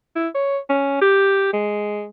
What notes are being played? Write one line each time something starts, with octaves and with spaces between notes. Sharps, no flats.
E4
C#5
C#4
G4
G#3